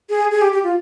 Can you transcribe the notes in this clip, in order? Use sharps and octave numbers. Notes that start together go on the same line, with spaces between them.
G#4
G#4
G4
G4
F4